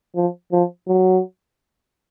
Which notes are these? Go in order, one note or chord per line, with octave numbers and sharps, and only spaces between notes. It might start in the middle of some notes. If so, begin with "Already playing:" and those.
F3
F3
F#3